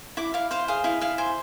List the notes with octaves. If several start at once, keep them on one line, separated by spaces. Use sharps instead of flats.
E4 D6
E4 F5
C5 F5
G#4 F5
E4 F5
E4 F5
C5 G#5